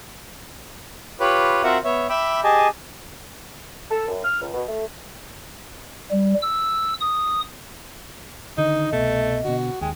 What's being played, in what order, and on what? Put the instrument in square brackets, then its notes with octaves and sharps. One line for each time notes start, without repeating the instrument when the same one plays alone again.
[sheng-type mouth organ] F4 G4 B4 C#5 B5
C4 F4 F#4 A#4 E5 F#5
B3 C#5 E5
E5 G5 B5 D6 E6
G4 G#4 D#5 G#5 A5
[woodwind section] A4
F#2
F6
C#2
B2
A3
[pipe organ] G3
E6
D#6
[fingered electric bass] D3 D#3 [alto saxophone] D#4 [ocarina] D#5
[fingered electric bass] C2 B2 [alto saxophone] A3
[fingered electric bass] B2 D3 [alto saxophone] F#4
[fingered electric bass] D#2 [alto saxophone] G#3 [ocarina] G5